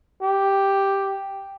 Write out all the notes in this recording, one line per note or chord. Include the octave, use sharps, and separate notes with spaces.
G4